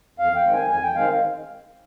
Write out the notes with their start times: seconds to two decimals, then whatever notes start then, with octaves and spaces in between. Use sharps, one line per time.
0.19 F2 F5
0.36 G5
0.45 D#3 G#3 C4
0.53 G#5
0.70 F2 G#5
0.83 G5
0.95 D#3 G#3 C4 F5